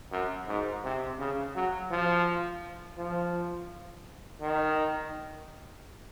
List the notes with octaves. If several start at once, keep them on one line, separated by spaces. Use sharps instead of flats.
F#2
G#2
C3
C#3
F#3
F3
F3
D#3